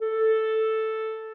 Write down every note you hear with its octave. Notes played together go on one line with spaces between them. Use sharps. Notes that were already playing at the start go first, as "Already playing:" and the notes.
A4